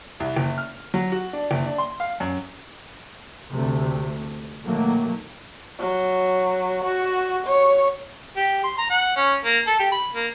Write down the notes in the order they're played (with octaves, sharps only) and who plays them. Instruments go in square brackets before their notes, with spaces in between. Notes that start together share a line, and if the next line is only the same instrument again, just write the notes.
[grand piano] C2
F#1
F6
F#3
F#4
D4
F#1
D4
C6
F5
F#2
[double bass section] D2 C3 A3
B2 D#3 F#3 A3 A#3
[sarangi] F#3
F#4
C#5
[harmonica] G4
C6
A#5
F#5
C#4
A#3
A4
G4
B5
A#3